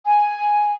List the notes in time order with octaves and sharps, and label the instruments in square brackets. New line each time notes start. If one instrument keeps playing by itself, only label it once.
[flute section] G#5